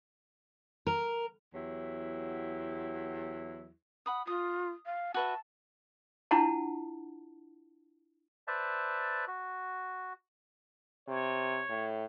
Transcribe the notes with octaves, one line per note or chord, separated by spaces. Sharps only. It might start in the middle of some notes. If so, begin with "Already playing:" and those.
A#4
E2 F#3 E4 G4
F#5 B5 D#6
F4 D#6
F5
F#4 B4 E5 A5
D4 E4 F4 F#5 A5
B4 C5 D5 E5 A5
F#4
C3 C#5
A2